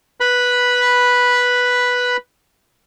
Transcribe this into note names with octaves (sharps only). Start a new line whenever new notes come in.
B4 B5